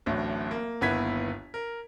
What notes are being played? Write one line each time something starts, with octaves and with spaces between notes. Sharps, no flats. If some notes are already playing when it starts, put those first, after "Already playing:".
D1 A1 D2
A#3
G1 D#2 B3 E4 G#6 B6
A#4